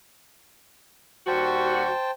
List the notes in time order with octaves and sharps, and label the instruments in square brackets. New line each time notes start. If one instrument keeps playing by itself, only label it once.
[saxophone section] D#2 G3 F#4 [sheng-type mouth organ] C5 G5 A5